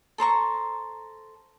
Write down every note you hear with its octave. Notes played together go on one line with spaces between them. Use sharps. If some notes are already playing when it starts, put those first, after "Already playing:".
A4 C5 A#5 C#6